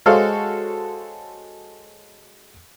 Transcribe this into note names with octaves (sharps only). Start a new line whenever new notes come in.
G#3 F#4 A4 C5 C#5 F5